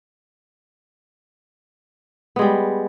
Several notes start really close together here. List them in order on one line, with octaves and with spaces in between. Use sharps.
B3 G#3 G3